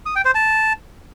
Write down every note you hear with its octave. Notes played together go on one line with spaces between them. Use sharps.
D#6
G5
C5
A5